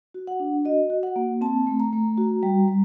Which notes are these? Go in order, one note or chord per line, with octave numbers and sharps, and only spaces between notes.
F#4
F#5
D4
F#4 D#5
F#4
F#5
A#3
C4 A5
A3
A#5
A3
F#4
G3
G3